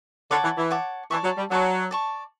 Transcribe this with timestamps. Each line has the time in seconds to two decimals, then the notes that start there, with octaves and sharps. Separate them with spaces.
0.31 D3 C#5 F#5 A5 D6
0.43 E3
0.58 E3
0.71 C#5 F#5 A5 D6
1.11 E3 D5 A5 C#6
1.24 F#3
1.38 G3
1.51 F#3 D5 A5 C#6
1.91 D5 A5 C#6